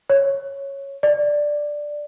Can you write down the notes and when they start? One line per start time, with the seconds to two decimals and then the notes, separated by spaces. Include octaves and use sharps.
0.10 C#5
1.03 D5